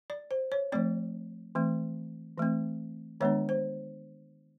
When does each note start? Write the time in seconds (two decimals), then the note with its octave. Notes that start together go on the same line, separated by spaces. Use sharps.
0.10 D5
0.31 C5
0.52 C#5
0.72 F3 A3 C4 D5
1.55 E3 A3 C4
2.38 E3 A3 C4
3.21 D#3 G#3 B3 D4 C#5
3.49 C5